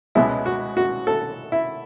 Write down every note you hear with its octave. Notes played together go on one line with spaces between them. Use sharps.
C#2 B2 G#3 B3 E4
F#4
F#4
A4
E4